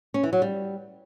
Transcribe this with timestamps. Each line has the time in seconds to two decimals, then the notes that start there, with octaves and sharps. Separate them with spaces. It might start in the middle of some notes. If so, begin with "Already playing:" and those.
0.14 C#4
0.23 E3
0.33 F#3
0.42 G3